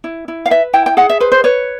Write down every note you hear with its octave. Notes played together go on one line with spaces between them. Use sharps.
E4
E4
F5
B4 E5
E4 G5
G5
G#4 F#5
E5
B4 C5
C5
B4 C#5